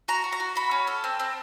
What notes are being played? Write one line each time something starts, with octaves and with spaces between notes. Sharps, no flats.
F#4 A#5
F#4
A#5
F#4
F#4 B5
C#4
A4
C4
C4